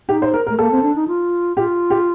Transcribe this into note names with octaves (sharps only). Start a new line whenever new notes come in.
D#4 G4
C5
A#4
A#4
A3
A#3 A4
C4
D4
D#4
F4
F4 G4
G4